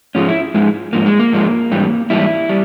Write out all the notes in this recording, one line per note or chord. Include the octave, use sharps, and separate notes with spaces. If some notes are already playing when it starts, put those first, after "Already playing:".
G#2 F3 G#3 C#4
E4
G#2 F3 G#3
G#2 F3 A#3
G#3
A#3
G#2 F3 G#3
G#2 E3 G3
G#2 E3 G3 E4
G3